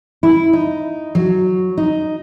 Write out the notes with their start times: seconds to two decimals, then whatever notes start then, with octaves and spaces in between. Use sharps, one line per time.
0.23 E4
0.53 D#4
1.15 F#3
1.78 D#4